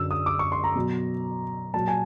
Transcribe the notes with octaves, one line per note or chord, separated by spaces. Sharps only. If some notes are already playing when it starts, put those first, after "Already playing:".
Already playing: F#2 D3 F#3 E6
D#6
D6
C#6
C6
A#5
B2 F#3
A#2 F#3 A5
G#5